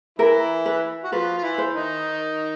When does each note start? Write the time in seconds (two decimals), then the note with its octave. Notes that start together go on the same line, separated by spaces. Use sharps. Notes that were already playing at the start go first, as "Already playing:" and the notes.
0.18 E3 E4 A#4
0.66 B4
1.04 F#4
1.12 F3 F4 B4
1.38 F4
1.43 E3 E4
1.58 C5
1.74 D#3 D#4